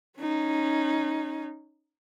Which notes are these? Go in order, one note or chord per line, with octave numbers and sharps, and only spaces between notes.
C#4 D#4